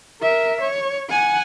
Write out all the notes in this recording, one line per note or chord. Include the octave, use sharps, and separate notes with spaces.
A#4 E5
C#5
F#5 G#5